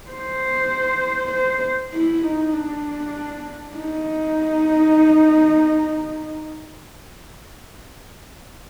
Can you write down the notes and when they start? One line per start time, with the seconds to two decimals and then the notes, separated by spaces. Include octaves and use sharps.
0.10 C5
1.31 C5
1.93 E4
2.23 D#4
2.54 D4
3.76 D#4